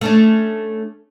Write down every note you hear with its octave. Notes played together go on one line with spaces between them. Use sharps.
A3 C#4 D4